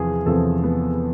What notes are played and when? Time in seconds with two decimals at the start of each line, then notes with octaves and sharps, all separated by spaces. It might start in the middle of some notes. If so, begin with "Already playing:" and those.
Already playing: E2 C3 F3 G#4
0.26 E2 C3 F3 A4
0.64 B3